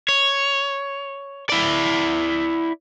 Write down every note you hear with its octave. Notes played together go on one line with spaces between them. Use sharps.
C#5
E4 D5